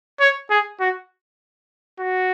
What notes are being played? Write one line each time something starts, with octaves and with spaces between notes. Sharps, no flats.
C#5
G#4
F#4
F#4